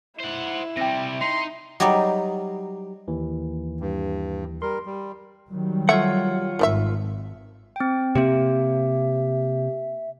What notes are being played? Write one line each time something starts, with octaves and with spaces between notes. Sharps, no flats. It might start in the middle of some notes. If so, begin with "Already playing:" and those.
E4 C5 F#5
C3 G3 G5 A#6
D#4 C6
F#3 G3 D#4 G4 D5
D#2 E3
G2
G3 A#4 C6
G3
D#3 F#3 G3
A3 F4 C#5 E5 F#5
G#1 D#3 D4 E5
C4 G5
C3 A#3 C4 G4 E5